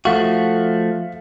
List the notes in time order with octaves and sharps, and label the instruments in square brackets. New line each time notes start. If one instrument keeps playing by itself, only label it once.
[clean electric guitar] F3 A3 F#4 [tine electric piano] F5